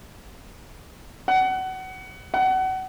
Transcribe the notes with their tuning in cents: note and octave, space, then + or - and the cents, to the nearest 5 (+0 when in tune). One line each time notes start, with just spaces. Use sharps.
F#5 +25
F#5 +30